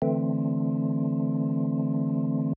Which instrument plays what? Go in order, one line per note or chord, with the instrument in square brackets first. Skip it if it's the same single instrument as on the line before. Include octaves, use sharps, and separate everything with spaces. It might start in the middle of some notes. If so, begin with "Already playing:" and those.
[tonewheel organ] D3 E3 A3 C4